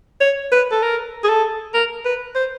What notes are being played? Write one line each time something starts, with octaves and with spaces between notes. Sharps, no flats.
C#5
B4
A4
A#4
G#4
A4
A#4
B4
C5